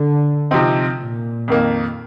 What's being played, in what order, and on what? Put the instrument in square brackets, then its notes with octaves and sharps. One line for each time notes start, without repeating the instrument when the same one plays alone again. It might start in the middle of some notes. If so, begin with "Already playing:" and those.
Already playing: [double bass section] D3
[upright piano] C3 F3 C4 D#4
[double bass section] A#2
[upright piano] F2 D#3 A#3